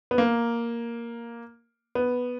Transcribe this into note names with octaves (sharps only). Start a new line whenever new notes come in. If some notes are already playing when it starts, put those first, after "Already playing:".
B3
A#3
B3